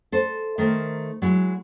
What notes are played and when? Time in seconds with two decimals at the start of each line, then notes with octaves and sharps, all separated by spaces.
0.12 A4 C5
0.58 D#3 A3 A#4 C5
1.22 F#3 G#3 E4